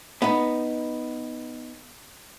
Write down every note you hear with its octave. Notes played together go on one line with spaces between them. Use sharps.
B3 D#4